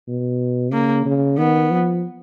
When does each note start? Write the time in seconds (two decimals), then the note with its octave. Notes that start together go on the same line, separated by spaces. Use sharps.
0.08 B2
0.72 C#3 A#3
1.06 C#3
1.38 D#3 B3
1.71 F3